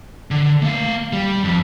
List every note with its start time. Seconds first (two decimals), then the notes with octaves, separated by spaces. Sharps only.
0.31 D3
0.62 A3 F5
1.13 G3
1.44 F2